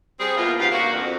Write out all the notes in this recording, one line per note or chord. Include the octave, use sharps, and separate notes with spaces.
G3 C4 G#4
B2 A#3 E4 F4
G#2 C#3 G4 B4 F5
A#3 D4 F#4
F2